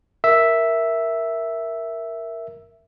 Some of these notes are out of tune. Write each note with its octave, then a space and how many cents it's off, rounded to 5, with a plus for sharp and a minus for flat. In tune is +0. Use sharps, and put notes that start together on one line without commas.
A#4 +0 E5 +0